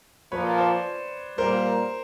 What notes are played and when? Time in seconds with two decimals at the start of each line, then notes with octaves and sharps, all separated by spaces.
0.32 A#2 F3 A#3 B4 C#5
0.58 C5 D5
1.38 A#2 G3 A#3 A#4 C5